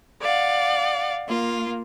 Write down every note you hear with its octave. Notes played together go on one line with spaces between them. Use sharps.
D5 F5 F#5
A#3 F4